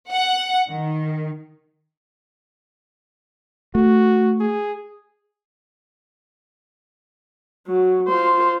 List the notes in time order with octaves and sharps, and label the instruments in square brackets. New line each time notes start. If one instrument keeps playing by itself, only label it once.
[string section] F#5
D#3
[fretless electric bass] A3 [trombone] F#4
[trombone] G#4
[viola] F#3
F4 C5